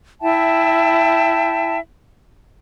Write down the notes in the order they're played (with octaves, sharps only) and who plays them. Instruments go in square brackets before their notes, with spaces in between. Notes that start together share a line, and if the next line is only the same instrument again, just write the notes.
[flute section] E4 E5 G5 A5